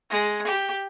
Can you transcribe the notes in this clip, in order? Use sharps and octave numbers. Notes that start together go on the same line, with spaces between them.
G#3
G4